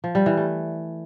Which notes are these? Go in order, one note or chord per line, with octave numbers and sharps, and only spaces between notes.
F3
G3
E3
A3